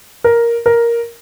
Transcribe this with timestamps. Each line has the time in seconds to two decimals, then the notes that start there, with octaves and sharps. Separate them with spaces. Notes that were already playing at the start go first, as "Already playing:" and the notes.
0.24 A#4
0.66 A#4